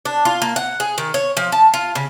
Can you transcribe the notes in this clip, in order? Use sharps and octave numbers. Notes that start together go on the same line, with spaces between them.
D4
F4
A#3
F#5
G#4
D#3
C#5
F3
A5
F4
C#3